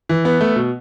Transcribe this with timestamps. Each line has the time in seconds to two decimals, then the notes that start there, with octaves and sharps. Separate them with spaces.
0.09 E3
0.25 B3
0.41 A3
0.56 B2